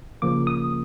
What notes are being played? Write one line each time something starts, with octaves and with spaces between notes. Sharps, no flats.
C#3 F3 A#3 D6
D#6